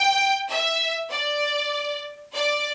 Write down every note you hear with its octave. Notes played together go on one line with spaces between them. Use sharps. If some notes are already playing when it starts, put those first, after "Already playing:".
Already playing: G5
E5
D5
D5